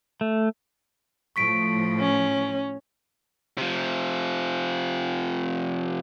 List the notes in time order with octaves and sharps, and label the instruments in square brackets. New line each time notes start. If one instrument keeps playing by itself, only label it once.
[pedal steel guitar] A3
[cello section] A2 F3 [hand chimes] C#6 B6 D7
[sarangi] C#4
[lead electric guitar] C3 F3